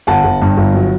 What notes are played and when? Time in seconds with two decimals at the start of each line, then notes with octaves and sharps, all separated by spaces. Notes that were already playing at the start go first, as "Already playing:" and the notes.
0.07 G1 F#5 A5
0.25 G1
0.42 G2
0.57 G1
0.74 F#3